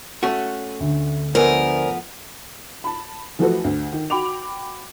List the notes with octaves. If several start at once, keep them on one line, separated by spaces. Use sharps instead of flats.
A3 C#4 F#4
D2 D3
F3 A3 B3 A#4 C5 D5 G#5
A5 B5
E3 F3 A3 F#4 A4 B4
D2
D#3
F#4 G5 B5 D6 F7